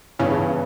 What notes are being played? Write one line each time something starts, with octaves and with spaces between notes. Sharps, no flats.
G2 C#3 E3 B3 D4